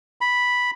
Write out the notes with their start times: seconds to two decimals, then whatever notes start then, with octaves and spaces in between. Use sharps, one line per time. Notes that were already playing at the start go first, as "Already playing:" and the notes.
0.21 B5